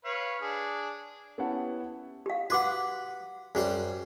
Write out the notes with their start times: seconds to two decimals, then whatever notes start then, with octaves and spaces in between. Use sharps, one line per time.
0.05 B4 C#5 F5
0.41 D4 G#4
1.38 B3 C#4 E4 G4 F#5 A5
2.26 G4 F5
2.50 F#4 B4 F#5 D6
3.55 F#2 G3 G#4 C5